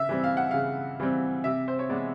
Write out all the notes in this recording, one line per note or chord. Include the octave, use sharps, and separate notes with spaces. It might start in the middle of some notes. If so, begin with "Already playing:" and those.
Already playing: C#3 E5
E3 G3 C4
F5
F#5
C#3 F5
E3 G3 C4
C3 E5
C5
C#5
E3 G#3 B3 D5